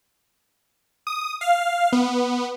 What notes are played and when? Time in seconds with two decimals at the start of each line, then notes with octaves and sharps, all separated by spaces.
1.07 D#6
1.41 F5
1.92 B3